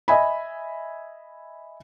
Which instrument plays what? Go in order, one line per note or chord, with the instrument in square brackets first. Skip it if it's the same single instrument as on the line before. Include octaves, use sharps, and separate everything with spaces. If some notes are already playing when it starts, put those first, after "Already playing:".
[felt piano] D#5 E5 G#5 B5